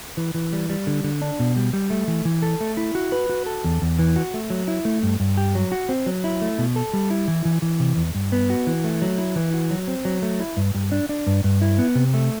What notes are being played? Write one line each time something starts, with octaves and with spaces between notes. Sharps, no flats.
E3
E3
G3
G3
D3
D3
D4
B2
G3
G3
A3
E3
E3
A4
A3
E4
F#4
B4
F#4
A4
E2
E2
E3
F#4
A3
F#3
E4
A3
G2
G2
G4
F#3
F#4
C4
F#3
E4
A3
B2
A4
G3
E4
E3
E3
E3
C3
E2
G2
B3
F#4
E3
A3
F#3
E4
E3
F#4
F#3
C4
F#3
A3
E4
G2
G2
D4
D4
G2
G2
E4
B3
C3
A3